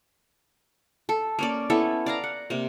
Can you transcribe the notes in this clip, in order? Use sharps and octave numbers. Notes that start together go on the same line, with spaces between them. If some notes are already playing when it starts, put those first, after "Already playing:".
A4
A#3 C#4 D5
B3 C#4 E4 A4
D5 F5 A#5
F#5
C3 A#3